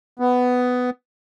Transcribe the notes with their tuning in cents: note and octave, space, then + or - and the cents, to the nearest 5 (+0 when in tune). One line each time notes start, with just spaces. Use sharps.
B3 +10